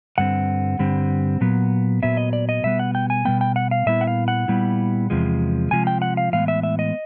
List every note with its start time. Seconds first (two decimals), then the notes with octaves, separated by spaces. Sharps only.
0.18 G2 D3 G3 C4 F#5
0.79 G2 D3 G3 C4
1.41 A#2 F#3 B3
2.02 A#2 F#3 B3 E5
2.17 D#5
2.33 D5
2.49 D#5
2.64 B2 G3 B3 E5
2.79 F#5
2.95 G5
3.10 G#5
3.25 B2 G3 B3 G5
3.41 G5
3.56 F#5
3.71 F5
3.86 A#2 G3 B3 E4 E5
4.01 F#5
4.07 F5
4.28 F#5
4.48 A#2 G3 B3 E4
5.10 E2 C3 F3 G#3
5.71 E2 C3 F3 G#3 G#5
5.87 G5
6.02 F#5
6.17 F5
6.33 A2 E3 G#3 B3 F5
6.48 E5
6.63 E5
6.79 D#5